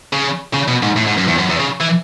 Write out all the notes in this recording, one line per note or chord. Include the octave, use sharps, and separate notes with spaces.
C#3
C#3
B2
G#2
A2
G#2
F#2
E2
F#2
E2
C#3
E3